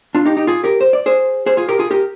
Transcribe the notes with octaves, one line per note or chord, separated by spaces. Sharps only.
D4 F4
D#4 G4
D#4 G4
F4 G#4
G4 A#4
C5
D5
G#4 C5
G#4 C5
F4 G#4
G4 A#4
F4 G#4
G4 A#4